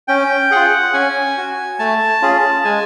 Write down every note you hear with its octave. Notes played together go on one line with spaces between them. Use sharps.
C#4 G5
F4 G#4 F#5
C#4 G#5
F#4
A3 A5
C#4 F4 G#4
G#3 G#5